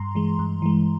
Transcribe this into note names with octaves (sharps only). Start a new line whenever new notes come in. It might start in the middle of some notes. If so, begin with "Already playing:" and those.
Already playing: G2 A#5 C6
E3 G#3
G2
E3 G#3